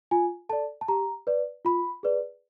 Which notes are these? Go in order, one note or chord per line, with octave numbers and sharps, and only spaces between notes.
F4 G#5
A4 D5 A5
A5
G4 A#5
B4 D5
F4 B5
G#4 B4 D5